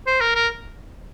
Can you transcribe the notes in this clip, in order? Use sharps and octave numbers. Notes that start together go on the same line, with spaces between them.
C5
A#4
A#4